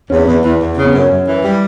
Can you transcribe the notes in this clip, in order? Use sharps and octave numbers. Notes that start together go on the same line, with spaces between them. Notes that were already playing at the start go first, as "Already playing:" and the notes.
E2 C#4
E2 B3
E2
E2
C#3
B3
F#2 C#4
F#2
E3
G3